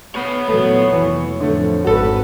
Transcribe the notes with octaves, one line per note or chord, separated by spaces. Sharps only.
B3 C#5 B5
E2 A#2 F#3 A3
F1 E3
F2 A2 D3 F3 A3
G#1 F#4 A4 B4